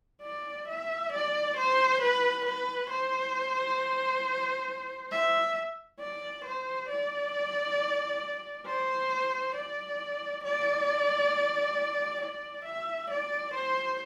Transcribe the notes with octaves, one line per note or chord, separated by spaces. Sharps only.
D5
E5
D5
C5
B4
B4
C5
E5
D5
C5
D5
C5
D5
D5
D5
E5
D5
C5